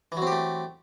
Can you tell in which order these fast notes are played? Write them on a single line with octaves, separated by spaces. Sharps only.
E3 F#3 C4 G4 A3